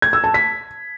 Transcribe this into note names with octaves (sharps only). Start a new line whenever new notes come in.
G#6
E6
A5
B6